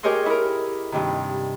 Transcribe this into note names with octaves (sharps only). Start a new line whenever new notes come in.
G4 G#4 A#4 C#5 D#5 C6
E4 A#4
G2 C3 D#3